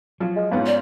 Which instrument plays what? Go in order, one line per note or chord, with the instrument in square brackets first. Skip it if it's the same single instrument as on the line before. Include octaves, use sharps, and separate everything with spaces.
[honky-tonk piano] F3 [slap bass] F#3
[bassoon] G#3
[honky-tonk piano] G#2 B3 F4 [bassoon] C#4
[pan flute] D5